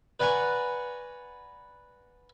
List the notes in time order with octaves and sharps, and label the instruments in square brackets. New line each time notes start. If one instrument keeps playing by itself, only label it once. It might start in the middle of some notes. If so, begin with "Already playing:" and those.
[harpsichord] B4 D5 F#5 G#5 A#5 C#6